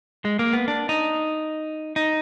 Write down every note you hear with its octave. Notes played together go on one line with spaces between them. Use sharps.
G#3
A#3
B3
D4
D#4
D#4